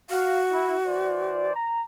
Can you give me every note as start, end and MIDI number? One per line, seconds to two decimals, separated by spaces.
0.10 1.45 66
0.10 0.42 77
0.52 0.74 64
0.86 1.52 52
0.86 1.52 72
0.86 1.52 74
1.55 1.83 82